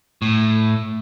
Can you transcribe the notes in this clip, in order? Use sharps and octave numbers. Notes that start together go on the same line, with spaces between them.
A2